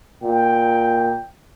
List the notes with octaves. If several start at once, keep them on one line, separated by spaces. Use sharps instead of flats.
A#2 G5